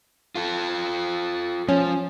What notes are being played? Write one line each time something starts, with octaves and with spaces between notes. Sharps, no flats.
F4 A4
F3 C#4